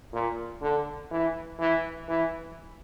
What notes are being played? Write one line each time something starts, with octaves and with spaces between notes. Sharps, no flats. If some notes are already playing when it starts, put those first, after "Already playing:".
A#2
D3
E3
E3
E3